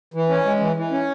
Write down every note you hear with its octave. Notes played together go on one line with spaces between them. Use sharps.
E3
C#4
G#3
E3
E3
C#4